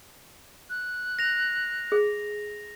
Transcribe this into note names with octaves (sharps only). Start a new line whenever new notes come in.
F#6
A#6 F7
G#4